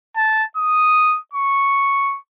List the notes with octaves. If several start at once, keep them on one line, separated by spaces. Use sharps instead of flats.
A5
D#6
C#6